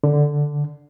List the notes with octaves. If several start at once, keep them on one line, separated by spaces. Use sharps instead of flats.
D3